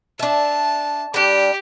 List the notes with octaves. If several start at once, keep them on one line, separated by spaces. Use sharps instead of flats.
D4 E5 A5
G3 D4 G4